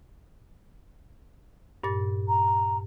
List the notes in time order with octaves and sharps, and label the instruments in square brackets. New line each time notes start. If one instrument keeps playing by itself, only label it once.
[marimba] G2 A#2 A6
[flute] A#5